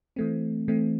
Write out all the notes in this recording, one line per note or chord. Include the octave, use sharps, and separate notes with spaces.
E3 A3 C4
E3 A3 C4